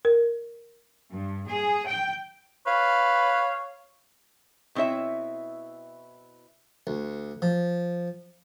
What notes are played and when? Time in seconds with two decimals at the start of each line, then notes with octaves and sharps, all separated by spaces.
0.05 A#4
1.11 G2
1.47 G#4
1.86 G5
2.67 B4 C#5 F5
4.75 B2 C4 E4 C#5 E5
6.87 D2
7.42 F3